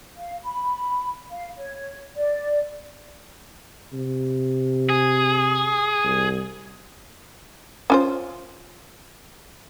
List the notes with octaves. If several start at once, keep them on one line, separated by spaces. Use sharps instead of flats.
F5
B5
F5
C#5
D5
C3
G#4
C2
C#4 F4 C5